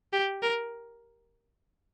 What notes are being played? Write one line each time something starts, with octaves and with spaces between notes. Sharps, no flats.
G4
A#4